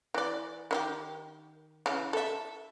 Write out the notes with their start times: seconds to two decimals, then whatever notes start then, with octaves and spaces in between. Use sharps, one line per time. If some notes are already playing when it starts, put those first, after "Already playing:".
0.14 E3 D5
0.71 D#3 D#4 G4
1.86 C#3 E3
2.13 A4 E5